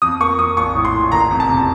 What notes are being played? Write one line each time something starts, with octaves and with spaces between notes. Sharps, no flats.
F2 D#6
A#3 C#6
F2 D#6
A#1 C#6
A2
C6
A2
F#1 A#5
F2
A5
C3